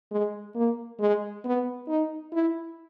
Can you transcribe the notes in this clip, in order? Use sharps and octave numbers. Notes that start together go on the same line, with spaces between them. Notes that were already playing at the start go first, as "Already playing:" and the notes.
G#3
A#3
G#3
B3
D#4
E4